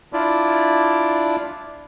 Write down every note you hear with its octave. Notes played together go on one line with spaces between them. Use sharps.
D4 E4 F4 D5